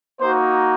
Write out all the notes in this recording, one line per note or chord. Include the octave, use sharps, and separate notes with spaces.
A#3 D#4 F#4 C5